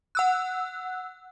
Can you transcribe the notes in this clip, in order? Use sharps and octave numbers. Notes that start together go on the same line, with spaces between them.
F#5 E6 F#6